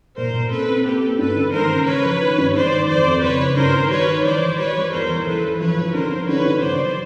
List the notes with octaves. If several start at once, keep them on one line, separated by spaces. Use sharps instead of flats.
A#2 A#4 C5
A#2
C4 A4 B4
C4
A#3 G4 A4
A#3
G2 A4 B4
D3
G#1 A#4 C5
C#3
C#3 B4 C#5
F3
D#3
G2
G#1 C5 D5
D#3
F2 C5 D5
F2
F#1 B4 C#5
F#1
G2 A#4 C5
D#3
G3 B4 C#5
D#3
E3 C5 D5
E3
G3 B4 C#5
G3
E2 A#4 C5
E3
E3 A4 B4
E3
F3 B4 C#5
F3
D3 A#4 C5
D3
D3 B4 C#5
D3
G1 C5 D5
F#3